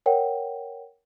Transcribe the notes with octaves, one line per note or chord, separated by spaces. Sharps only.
A#4 C#5 F#5 G5